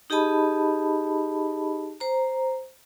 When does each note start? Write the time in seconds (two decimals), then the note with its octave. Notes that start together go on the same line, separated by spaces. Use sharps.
0.10 D#4 G4 G#4 D#5 A5 B5
2.00 C5 A#5